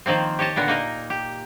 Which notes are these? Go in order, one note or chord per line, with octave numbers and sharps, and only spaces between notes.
D#3 F3 A#3 C4
G4 C#5 D#5 A5
A#2 D3 B3 A#4
A#3 D#4 A#4
G4